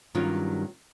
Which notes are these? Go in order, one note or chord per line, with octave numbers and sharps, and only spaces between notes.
G2 D#3 F#3 G3 C#4 F4